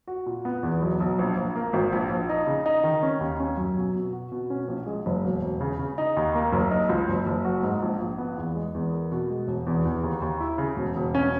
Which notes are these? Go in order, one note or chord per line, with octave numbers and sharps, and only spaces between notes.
F#4
A#2
B3
E2
B1
B1
A#1
A#1
A#3
G#1
A#1
A#1
D#4
C#3
D#4
D#3
C#4
D#2
C#4
F#2
B2
B2
F#4
B2
C#4
A#1
G#3
F#1
E1
E1
C#3
C#3
D#4
D#2
A#3
F#1
D#4
C#2
F#1
F#1
F#4
G#2
A#1
A#1
B3
E2
G#3
E2
A#4
B2
G#3
E1
E2
E2
D#2
D#2
E4
C#3
E1
E1
C#4